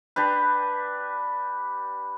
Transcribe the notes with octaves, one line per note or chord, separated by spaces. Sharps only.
D4 G4 B4